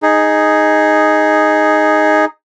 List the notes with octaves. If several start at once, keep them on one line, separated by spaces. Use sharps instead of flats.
D#4 G#4